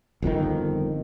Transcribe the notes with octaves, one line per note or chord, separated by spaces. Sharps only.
G1 F2 A#2 D#3